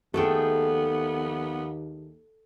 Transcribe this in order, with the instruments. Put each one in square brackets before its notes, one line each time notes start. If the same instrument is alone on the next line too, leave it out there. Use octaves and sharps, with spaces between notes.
[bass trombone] D#2 [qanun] A3 G#4 G5 [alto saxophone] B3 [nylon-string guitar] A4